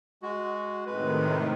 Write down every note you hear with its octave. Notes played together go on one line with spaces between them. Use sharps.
G#3 F#4
A2 C3 D#3 G#3 B4